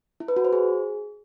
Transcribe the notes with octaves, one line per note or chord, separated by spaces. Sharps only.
E4
B4
F#4
C5
G#4